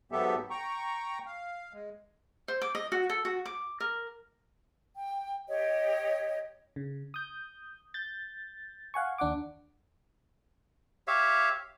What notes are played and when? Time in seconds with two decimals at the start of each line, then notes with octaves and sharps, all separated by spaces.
0.12 G#2 F#3 B3 G4 A4 E5
0.50 G5 A#5 C#6
1.26 F5
1.73 G#3
2.48 C5
2.62 D6
2.75 D#5
2.92 F#4
3.10 A4
3.25 F#4
3.45 D6
3.80 A#4
4.96 G5
5.48 G4 C#5 D#5
6.76 C#3
7.14 D#6 G6
7.94 G6 A6
8.94 F5 F#5 G#5 C#6
9.18 D#2 D4 F#5 D6
11.08 G4 C#5 E5 F5